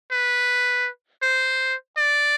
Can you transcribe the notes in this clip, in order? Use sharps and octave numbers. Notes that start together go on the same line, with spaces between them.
B4
C5
D5